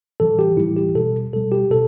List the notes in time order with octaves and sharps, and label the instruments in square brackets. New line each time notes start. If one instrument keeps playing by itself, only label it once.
[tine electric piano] A2 E3 G3 A4
G4
A2 E3 G3 E4
G4
B2 G3 A4
B2 G3 A4
G4
B2 A4